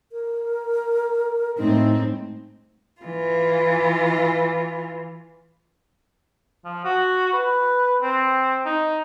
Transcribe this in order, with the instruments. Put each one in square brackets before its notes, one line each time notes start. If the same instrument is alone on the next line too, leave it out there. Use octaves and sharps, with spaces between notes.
[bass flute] A#4
[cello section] A2 G#3 C4 [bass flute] D#4
[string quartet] E3 F4
[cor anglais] F3
F#4
B4
C4
D#4